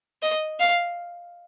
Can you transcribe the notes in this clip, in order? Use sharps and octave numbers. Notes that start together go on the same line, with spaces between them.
D#5
F5